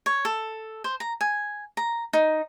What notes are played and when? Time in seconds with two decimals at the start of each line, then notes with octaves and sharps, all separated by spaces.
0.06 C#5
0.25 A4
0.84 C5
1.00 A#5
1.21 G#5
1.77 A#5
2.13 D#4